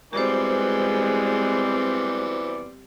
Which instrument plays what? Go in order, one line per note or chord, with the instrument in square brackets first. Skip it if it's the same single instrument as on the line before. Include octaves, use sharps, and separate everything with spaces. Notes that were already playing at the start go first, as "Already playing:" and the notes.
[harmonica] E3 B3 D5 [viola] G3 C4 [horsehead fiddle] G#3 [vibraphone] F#4 C5